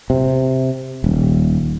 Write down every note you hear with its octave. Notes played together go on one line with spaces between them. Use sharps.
C3
D#1